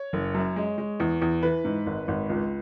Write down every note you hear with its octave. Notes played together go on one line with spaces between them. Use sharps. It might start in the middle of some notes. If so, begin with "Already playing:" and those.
Already playing: C#5
F#1
F#2
G#3
G#3
E2
E2
E3 B4
G#2
G#1
G#1
C#2